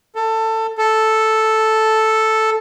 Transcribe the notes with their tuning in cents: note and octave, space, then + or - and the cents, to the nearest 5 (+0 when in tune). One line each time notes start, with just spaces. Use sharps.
A4 +20
A4 +0